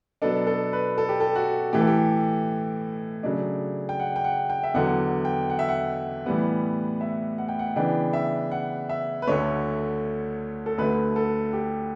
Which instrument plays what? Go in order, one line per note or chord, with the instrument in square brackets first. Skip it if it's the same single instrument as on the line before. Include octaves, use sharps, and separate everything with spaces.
[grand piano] B2 F#3 B3 D4 A4
A4
B4
A4
G4
A4
F#4
A2 E3 A3 G4
A4
G4
C#3 F#3 A3 D4
G5
F#5
G5
F#5
G5
E5
E2 D3 F#3 F#5
G5
F#5
E5
F#5
A2 E3 G3 B3
E5
F#5
G5
F#5
C#3 E3 B3 D4 G5
E5
F#5
E5
B4
D2 D3 A3 C#5
A4
D2 D3 A3 B4
A4
G4